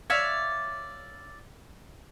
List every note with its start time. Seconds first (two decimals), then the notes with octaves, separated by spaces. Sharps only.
0.10 C#5 D5 E5 F5